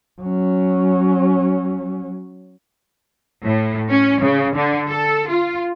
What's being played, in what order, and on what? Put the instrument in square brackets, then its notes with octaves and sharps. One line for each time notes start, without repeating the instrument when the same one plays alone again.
[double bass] F#3 C#4
[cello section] A2
C#4
C#3
D3
A4
F4